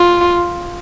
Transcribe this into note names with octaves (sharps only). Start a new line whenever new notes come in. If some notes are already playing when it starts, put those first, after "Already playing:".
Already playing: F4